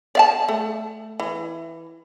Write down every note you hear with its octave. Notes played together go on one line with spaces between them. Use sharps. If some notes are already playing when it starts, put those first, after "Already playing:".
D5 F5 A5
A3
E3